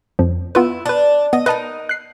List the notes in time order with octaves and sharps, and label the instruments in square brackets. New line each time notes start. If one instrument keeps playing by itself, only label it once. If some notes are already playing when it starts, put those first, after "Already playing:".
[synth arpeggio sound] F2 F3
[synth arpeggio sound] B3 F4 B4 [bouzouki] E4
[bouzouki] D4 [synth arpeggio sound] B4 A5
[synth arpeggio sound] B3 [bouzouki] D#5
[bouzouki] D#4 A#4 [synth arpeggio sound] B4 D#5 A5
[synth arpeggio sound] F#6 C7